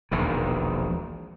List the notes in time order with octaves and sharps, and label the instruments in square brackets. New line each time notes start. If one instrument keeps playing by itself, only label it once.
[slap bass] E1 A#1 D#2 D#3